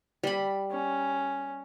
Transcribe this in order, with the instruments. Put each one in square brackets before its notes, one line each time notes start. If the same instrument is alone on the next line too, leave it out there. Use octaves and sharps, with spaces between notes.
[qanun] G3 B5
[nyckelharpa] C#4